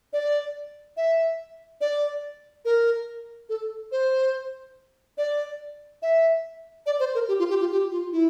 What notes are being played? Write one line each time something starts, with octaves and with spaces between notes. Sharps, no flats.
D5
E5
D5
A#4
A4
C5
D5
E5
D5
C5
A#4
G4
F4
G4
F4
G4
F4
E4